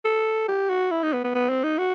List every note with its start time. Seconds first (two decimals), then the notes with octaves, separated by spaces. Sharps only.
0.05 A4
0.48 G4
0.70 F#4
0.91 E4
1.03 D#4
1.13 B3
1.24 B3
1.35 B3
1.49 C4
1.64 D#4
1.78 F#4